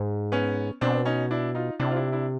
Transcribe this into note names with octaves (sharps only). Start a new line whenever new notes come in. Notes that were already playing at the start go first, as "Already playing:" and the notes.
Already playing: G#2
B3 C#4
B2 C4 D4
C#4 D#4
D4 E4
D#4 F4
C3 D4 E4
F4
D4 E4
D4 E4